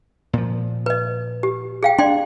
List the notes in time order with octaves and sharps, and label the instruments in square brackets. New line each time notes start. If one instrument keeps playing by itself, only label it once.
[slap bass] A#2 F3
[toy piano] B4 D#5
G4
G#4 F5 G5
[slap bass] D4 [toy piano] D5 G5 C6